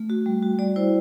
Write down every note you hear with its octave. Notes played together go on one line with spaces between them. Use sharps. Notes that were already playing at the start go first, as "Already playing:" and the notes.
Already playing: A3
F#4
G3
F#4
G3 D5
E4 C5